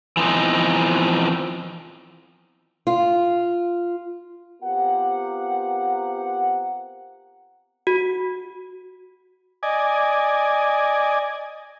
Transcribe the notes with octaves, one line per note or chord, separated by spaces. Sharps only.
E3 F3 B3 C4 D#4
F4
B3 C4 F4 G4 A#4 F#5
F#4
D5 D#5 G#5